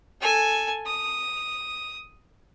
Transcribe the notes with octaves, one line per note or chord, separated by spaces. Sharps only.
A4 G#5
D#6